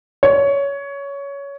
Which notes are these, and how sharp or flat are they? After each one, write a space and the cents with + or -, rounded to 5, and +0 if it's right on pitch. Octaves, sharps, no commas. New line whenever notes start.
C#5 +15